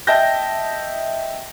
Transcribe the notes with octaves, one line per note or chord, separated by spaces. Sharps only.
D#5 E5 G5 A5 G6 A#6